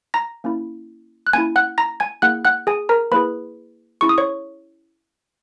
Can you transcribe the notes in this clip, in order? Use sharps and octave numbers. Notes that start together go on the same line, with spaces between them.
A#5 A#6
A#3 C#4 E4
F#6
A#3 C#4 E4 G#5 G#6
F#5 F#6
A#5 A#6
G#5 G#6
A#3 E4 G#4 F#5 F#6
F#5 F#6
G#4 G#5
A#4 A#5
A#3 E4 G#4 B4 B5
C#4 E4 G#4 C#6
D#6
C#5 C#6